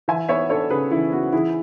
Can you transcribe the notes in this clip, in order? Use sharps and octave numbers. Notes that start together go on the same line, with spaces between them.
E3 E5 G#5
B3 C#5 E5
D4 A4 C#5
C#3 G#4 B4
E3 E4
B3 F#4
E3 E4 G#4